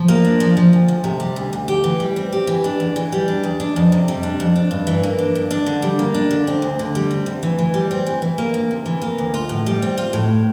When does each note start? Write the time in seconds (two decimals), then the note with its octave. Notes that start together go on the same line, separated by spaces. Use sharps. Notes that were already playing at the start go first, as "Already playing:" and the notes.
Already playing: F3
0.08 A#3
0.24 D4
0.40 F3
0.57 F3
0.73 D2
0.88 D2
1.04 C3
1.20 G3
1.36 D2
1.53 D2
1.68 G4
1.84 E3
2.00 G3
2.16 C4
2.32 G4
2.47 E3
2.64 D4
2.80 E2
2.96 E3
3.12 G3
3.28 D4
3.43 E2
3.60 D4
3.76 F2
3.92 C3
4.08 G3
4.23 D4
4.40 F2
4.56 D4
4.71 G2
4.87 E3
5.03 A#3
5.19 D4
5.35 G2
5.51 D4
5.66 D3
5.82 G3
5.99 A#3
6.14 D4
6.31 D3
6.47 C4
6.62 D2
6.79 D3
6.95 G3
7.11 C4
7.26 D2
7.43 E3
7.58 E3
7.74 G3
7.91 C4
8.06 E3
8.22 E3
8.38 A#3
8.54 D2
8.71 C3
8.86 E3
9.02 A#3
9.18 D2
9.34 F4
9.49 A2
9.66 G3
9.82 C4
9.98 F4
10.13 A2